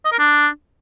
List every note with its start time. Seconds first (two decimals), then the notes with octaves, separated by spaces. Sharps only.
0.05 D#5
0.12 A#4
0.19 D4